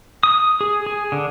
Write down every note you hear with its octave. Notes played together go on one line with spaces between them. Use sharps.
D#6
G#4
G#4
D3